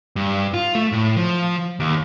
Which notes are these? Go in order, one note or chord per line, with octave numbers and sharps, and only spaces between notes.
G2
F4
A3
A2
F3
D#2